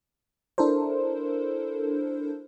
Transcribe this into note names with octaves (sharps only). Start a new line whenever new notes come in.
D4 E4 A4 A#4 C5